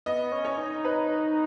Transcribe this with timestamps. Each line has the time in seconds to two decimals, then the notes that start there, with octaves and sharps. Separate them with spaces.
0.06 B3 D#5
0.32 C#4
0.45 C#5
0.58 D#4
0.85 B4